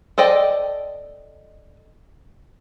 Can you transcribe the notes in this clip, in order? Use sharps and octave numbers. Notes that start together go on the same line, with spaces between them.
A4 C5 D5 D#5 G5